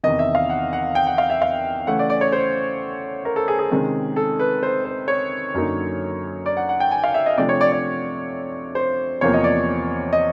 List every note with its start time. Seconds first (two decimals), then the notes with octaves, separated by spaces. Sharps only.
0.04 E2 C3 D#3 D#5
0.19 E5
0.35 F5
0.50 F#5
0.73 F#5
0.95 G5
1.07 F#5
1.18 F5
1.30 E5
1.42 F5
1.87 C#3 E3 A3 C#4 F#5
1.99 D5
2.10 D5
2.21 C#5
2.32 C5
3.25 A#4
3.36 A4
3.48 G#4
3.59 G#4
3.71 C3 D#3 G#3 C#4
4.16 A4
4.39 B4
4.63 C5
4.85 C5
5.08 C#5
5.54 F#2 D3 F#3 A#3 D#4
6.46 D5
6.57 F#5
6.69 F#5
6.80 G5
6.91 G#5
7.04 F5
7.14 E5
7.26 D#5
7.38 C3 F3 A3 D4 D5
7.49 C#5
7.61 D5
7.72 D5
8.75 C5
9.21 E2 C3 F3 A#3 C#5
9.34 D#5
9.44 D5
10.13 D#5